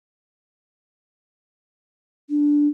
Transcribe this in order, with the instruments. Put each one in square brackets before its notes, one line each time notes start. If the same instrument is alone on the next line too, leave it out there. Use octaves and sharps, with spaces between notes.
[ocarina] D4